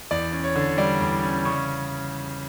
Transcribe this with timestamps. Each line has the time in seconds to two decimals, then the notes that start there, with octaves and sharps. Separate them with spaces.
0.11 E2 D5
0.33 C#4
0.44 C#5
0.55 D3
0.78 G3 D5
1.01 E2
1.23 C#4
1.45 C#3 C#6